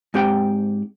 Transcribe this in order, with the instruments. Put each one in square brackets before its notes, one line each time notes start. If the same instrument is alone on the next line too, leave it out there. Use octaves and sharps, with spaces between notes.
[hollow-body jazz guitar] G#2 C4 G4 F#5 G5